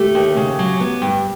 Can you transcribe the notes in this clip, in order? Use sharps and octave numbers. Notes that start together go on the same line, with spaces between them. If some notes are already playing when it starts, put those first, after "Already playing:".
Already playing: A3 G4
D#2
C#3
F#3
B3
G2